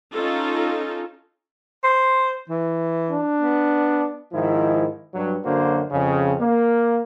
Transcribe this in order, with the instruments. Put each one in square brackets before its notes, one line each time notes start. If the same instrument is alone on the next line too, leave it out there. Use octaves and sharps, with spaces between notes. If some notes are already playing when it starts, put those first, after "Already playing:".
[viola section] C#4 D#4 F4 A4
[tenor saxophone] C5
E3
[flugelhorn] D4
[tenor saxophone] B3
[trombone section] G#2 D#3 F3 E4
G2 F#3
F#2 D3 A#3 F#4 C5
F2 C#3
A#3